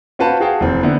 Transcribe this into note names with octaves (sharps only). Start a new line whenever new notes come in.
C#4 F4 F#4 B4 C5 A5
F#4 G#4 F5 G5 A5
F1 E3 C4
D3 B3 C4 E4